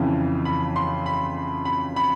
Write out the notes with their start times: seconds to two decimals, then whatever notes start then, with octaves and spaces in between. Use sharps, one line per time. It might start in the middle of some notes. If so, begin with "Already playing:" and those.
Already playing: F2 C#3 E3
0.45 B5
0.76 C6
1.06 B5
1.65 B5
1.96 B5